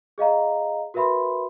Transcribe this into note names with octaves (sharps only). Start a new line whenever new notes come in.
G#4 D#5 F5 A#5
F#4 A#4 B4 E5 B5 C6